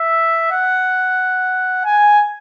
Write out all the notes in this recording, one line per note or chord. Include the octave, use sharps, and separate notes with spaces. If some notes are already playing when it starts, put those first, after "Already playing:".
Already playing: E5
F#5
G#5